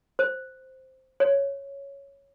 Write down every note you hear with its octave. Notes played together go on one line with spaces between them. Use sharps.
C5
C#5